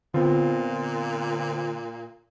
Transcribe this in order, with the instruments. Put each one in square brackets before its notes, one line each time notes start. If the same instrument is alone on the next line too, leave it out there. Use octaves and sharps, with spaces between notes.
[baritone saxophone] A#2 [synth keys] D3 [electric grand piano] B3 C4 F4